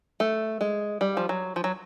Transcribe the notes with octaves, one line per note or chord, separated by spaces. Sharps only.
A3
G#3
G3
F3
F#3
F3
F#3